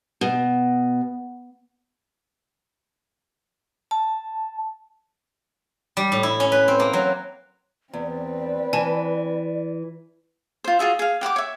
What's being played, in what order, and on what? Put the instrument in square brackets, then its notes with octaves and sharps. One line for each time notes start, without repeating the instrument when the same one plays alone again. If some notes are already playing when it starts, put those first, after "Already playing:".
[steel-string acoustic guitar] B2
[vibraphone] A5
[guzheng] G3
A2
E4
C#4
B4
C4
A#3
F#3
[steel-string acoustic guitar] E2 [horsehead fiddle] C4 B4 [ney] D5
[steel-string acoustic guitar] E3 [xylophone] G#5 A5
[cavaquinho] F4 C5
F4 F#4 G#4 E5
G#4 F5
G4 F#5 B5 D6
C#5 E5